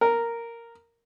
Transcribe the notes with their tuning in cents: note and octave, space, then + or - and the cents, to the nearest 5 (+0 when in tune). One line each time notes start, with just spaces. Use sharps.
A#4 -5